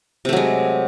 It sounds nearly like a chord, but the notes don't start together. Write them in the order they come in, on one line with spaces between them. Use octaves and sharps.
C3 A3 F#3 G#3